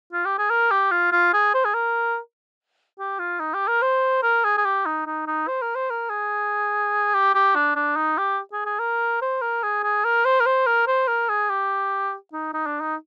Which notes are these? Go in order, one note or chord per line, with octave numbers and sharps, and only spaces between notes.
F4
G4
G#4
A#4
G4
F4
F4
G#4
C5
G#4
A#4
G4
F4
D#4
G4
A#4
C5
A#4
G#4
G#4
G4
D#4
D#4
D#4
C5
A#4
C5
A#4
G#4
G4
G4
D4
D4
D#4
G4
G#4
G#4
A#4
C5
A#4
G#4
G#4
A#4
C5
A#4
C5
A#4
C5
A#4
G#4
G4
D#4
D#4
D4
D#4